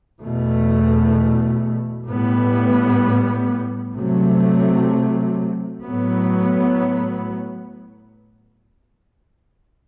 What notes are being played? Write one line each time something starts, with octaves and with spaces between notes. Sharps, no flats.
E2 B2 A3
A2 G3 B3
C3 F#3 A3
A2 F#3 B3